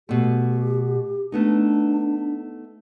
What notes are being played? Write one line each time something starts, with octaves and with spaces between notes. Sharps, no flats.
B2 A3 G4
A3 B3 D4 D#4